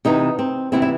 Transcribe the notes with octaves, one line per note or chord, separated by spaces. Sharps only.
C3 E3 B3 D#4
C4
C3 E3 B3 C4 E4
E4